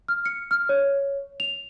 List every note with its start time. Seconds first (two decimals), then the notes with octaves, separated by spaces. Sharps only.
0.08 F6
0.26 C#7
0.51 F6
0.69 C#5
1.40 F7